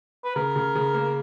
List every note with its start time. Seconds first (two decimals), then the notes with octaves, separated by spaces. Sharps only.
0.24 B4
0.36 C#3 A#4
0.56 C#3
0.75 C#3
0.94 A#3